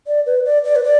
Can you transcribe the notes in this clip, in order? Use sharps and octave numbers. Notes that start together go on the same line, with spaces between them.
D5
B4
D5
D5
B4
D5